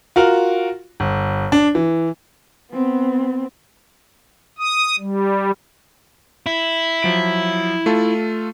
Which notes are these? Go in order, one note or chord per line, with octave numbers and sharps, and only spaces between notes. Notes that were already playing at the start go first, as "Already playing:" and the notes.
F4 F#4 A#4
G1
D4
E3
B3 C4
D#6
G3
E4
F3 F#3 D7
A3 F4 A4